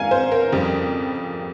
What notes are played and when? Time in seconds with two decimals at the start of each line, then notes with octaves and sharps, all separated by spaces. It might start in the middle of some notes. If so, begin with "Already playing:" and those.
Already playing: G#2 F5 G#5
0.11 C5
0.32 A#4
0.52 F2 C#3 G3